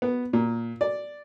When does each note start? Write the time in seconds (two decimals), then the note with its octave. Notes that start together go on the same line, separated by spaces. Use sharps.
0.02 B3
0.33 A#2
0.81 D5